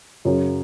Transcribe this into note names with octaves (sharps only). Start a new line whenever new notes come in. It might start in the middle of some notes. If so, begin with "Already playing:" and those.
F#2 C#3 F#3